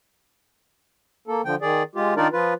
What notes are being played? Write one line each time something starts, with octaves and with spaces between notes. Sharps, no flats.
A#3 A4
D3 F3 G5
D#3 G#4 D5
G#3 F4 G4
D#3 D4 D#4 F4 A#4 D5
F3 F4 B4